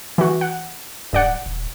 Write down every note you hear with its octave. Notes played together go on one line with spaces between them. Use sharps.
E3 F#4
F#5
D1 G2 D5 F#5
D#1